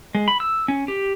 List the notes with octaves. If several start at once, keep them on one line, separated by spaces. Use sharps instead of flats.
G#3
B5
E6
C#4
G4